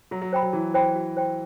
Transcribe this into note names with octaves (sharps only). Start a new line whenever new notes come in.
F#3 F#4
F#3
C5 G5 B5
F#3
E3 F#4
C5 G5 B5
F#4
C5 G5 C6